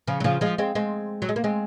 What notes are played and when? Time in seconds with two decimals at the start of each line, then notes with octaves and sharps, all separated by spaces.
0.07 C#3 F3
0.20 F#3
0.24 C#3 F3
0.41 F3 G#3
0.58 G#3 C4
0.75 G#3 C4
1.22 F#3
1.29 G#3
1.36 A#3
1.44 G#3 C4